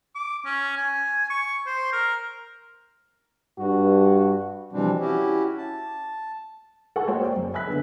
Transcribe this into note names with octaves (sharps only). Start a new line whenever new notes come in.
D6
C#4
G#5
C#6
C5
A#4
G2 F#4
B2 E3 F3 G3 C4 D4
C#4 E4 F#4 G4
A5
A4 F#5 G#5 C#6
G#3 A#3 F#4 C5 C#5 G5
C5 D5 G5
F#1 F#2
E5 G#5 B5 E6 F#6 B6
D3 B3